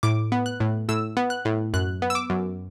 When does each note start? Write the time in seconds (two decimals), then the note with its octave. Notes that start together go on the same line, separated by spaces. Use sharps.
0.03 A2 D6
0.32 B3
0.46 F#6
0.60 A2
0.89 A2 E6
1.17 B3
1.30 F#6
1.45 A2
1.74 F#2 F#6
2.02 B3
2.10 E6
2.15 D6
2.30 F#2